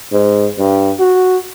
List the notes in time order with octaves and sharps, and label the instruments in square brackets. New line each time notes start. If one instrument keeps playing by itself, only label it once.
[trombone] G#2
G2
F#4